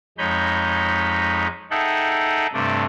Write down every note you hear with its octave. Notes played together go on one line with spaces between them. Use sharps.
F2 G#3 D#4 C#5 B5 G6
D#4 G#4 A4 E5 F#5 G5
G2 C3 A3 D4